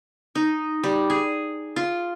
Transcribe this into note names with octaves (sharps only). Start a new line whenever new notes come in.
D#4
G3
G#4
F4